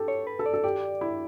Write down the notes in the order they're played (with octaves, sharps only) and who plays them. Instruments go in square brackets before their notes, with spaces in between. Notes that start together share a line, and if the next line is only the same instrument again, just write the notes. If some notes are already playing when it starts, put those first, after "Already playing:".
Already playing: [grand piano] G4 A4
[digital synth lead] C#5
B4
[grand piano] A4
[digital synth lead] D5
[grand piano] A4
[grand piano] G4 [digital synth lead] D5
[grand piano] E4